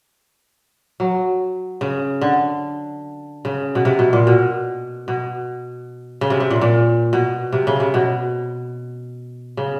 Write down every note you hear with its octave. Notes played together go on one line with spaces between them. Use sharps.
F#3
C#3
D3
C#3
B2
C3
B2
A#2
B2
B2
C#3
C3
C3
A#2
A#2
B2
C3
C#3
C3
B2
C#3